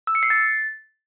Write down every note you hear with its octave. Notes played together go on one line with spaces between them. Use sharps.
E6
C#7
C7
A6